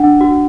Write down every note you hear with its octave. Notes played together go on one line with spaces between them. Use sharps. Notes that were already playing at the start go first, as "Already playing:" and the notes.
Already playing: D4 F#5
F#4